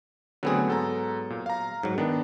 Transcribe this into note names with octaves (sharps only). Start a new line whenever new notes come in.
D3 F#3 A3 B3 C4 G#4
G#2 A4 A#5
A#2
F5 A#5
G#2 F#3
D#3 B3 D4